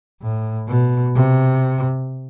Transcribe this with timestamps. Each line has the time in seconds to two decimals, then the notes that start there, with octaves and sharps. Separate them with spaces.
0.21 A2
0.68 B2
1.15 C3